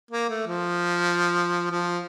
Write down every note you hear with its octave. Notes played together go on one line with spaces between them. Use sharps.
A#3
A3
F3
F3